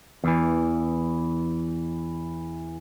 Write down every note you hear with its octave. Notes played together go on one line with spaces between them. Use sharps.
E2 E3